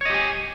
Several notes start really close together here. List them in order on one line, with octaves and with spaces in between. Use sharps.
C#5 D#5 G4 G#5